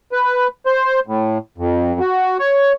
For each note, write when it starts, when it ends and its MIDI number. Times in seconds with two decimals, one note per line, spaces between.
0.12 0.47 71
0.66 1.00 72
1.07 1.38 45
1.58 1.99 41
2.00 2.37 66
2.39 2.73 73